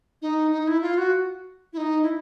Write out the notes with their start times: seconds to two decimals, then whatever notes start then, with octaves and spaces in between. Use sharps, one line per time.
0.22 D#4
0.51 D#4
0.67 E4
0.82 F4
0.98 F#4
1.73 E4
1.77 D#4
2.03 E4